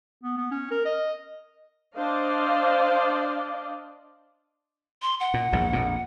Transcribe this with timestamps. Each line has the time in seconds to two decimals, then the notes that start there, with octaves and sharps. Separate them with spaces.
0.23 B3
0.37 B3
0.51 C#4
0.71 A#4
0.85 D#5
1.97 D4 C5 D5 D#5 F5
5.02 C6
5.20 F#5
5.34 A#2
5.53 A#1 E2 G#2
5.73 A#1 F2 A#2